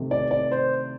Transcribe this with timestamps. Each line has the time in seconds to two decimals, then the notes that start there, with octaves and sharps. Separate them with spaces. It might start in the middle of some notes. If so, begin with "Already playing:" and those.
Already playing: C3 D#3 A3
0.11 D5
0.31 D5
0.51 C5